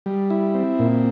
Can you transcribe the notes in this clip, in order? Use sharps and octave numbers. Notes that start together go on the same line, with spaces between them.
G3
E4
C4
A#2